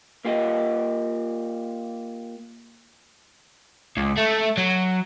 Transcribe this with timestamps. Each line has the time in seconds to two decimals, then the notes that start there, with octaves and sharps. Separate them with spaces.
0.25 A#3 F4 G4 D#5
3.97 C#2
4.17 A3
4.57 F#3